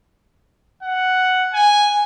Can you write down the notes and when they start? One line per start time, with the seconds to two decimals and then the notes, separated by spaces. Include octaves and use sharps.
0.83 F#5
1.54 G#5